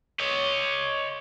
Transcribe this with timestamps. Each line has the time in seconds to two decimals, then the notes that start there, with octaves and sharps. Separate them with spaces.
0.20 C#5 D#5